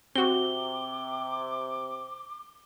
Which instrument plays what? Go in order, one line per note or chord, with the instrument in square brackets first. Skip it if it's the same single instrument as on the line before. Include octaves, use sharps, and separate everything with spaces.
[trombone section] C3 [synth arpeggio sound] C4 F#4 [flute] D6 [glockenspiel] G7